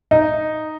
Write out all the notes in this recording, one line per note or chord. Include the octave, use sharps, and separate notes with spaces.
D#4